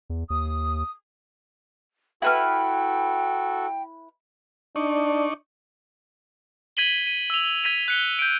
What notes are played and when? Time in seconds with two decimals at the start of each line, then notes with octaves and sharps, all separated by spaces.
0.10 E2
0.30 D#2 D#6
2.22 E4 F#4 A4 B4 G5 F6
4.76 D4 D#4 D5 C#6
6.77 G#6 B6 D#7 F#7 G7
7.07 D#7
7.30 E6 F7
7.63 G#6 B6 D#7 F7
7.88 F#6 C#7 G7
8.19 G6 D7